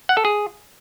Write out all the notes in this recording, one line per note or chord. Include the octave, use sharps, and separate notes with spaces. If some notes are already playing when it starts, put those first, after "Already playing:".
F#5
A4
G#4